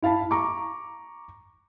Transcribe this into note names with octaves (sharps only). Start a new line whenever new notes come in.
E4 F5 A5 B5
A#5 C#6 D6